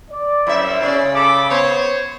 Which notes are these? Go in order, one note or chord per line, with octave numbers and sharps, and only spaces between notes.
D5
F#2 G3 C4 E4 E5
C#3 C#4 D5
A4 B5 D6
B3 C5 C#5